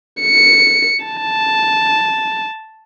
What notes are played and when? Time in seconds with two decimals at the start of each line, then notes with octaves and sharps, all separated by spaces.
0.21 C#7
1.05 A5